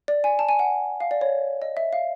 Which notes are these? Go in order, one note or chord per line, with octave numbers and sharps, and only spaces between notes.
D5
G#5
A5
G#5
F#5
F5
D5
C#5
D#5
E5
F5